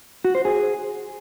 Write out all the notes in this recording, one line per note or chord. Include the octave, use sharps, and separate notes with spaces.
F#4
C5
G#4